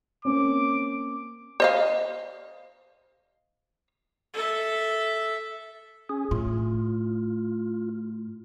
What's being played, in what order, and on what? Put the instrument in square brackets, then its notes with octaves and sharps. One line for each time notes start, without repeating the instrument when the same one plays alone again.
[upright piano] A#3 C4 C#4 [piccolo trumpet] D6
[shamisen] C5 D#5 F5
[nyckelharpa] A4 E5
[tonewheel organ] C#4 G#4
[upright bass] A2 [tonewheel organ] F4